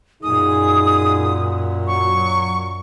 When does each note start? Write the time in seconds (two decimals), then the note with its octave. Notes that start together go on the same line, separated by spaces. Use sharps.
0.23 F#2 A#2 D#4 G#4 D#6
1.87 F#3 C#6